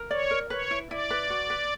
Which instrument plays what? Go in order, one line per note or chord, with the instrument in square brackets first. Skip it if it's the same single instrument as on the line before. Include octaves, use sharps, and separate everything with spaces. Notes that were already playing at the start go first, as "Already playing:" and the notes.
Already playing: [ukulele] A#4
[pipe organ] C#5 [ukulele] D5
[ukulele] A#4
[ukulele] B4 [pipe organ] C#5
[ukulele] E4
[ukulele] E4 [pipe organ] D5
[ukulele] B4
F#4
B4